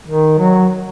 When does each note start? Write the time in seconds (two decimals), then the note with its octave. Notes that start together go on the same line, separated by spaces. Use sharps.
0.08 D#3
0.39 F#3